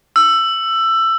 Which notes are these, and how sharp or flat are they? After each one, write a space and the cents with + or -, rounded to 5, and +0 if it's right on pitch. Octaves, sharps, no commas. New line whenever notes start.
E6 +15